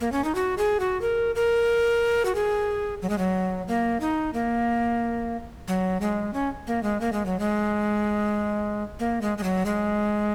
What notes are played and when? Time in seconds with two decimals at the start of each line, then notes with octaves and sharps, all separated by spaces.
0.01 A#3
0.12 C#4
0.24 D#4
0.35 F#4
0.58 G#4
0.80 F#4
1.02 A#4
1.35 A#4
2.25 F#4
2.35 G#4
3.02 F#3
3.10 G#3
3.18 F#3
3.68 A#3
4.00 D#4
4.34 A#3
5.68 F#3
6.01 G#3
6.34 C#4
6.67 A#3
6.83 G#3
7.01 A#3
7.13 G#3
7.26 F#3
7.40 G#3
8.99 A#3
9.22 G#3
9.38 G#3
9.43 F#3
9.66 G#3